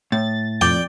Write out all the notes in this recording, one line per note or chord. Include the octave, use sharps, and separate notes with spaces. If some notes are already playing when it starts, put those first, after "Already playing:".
A2 A6
F2 D5 G5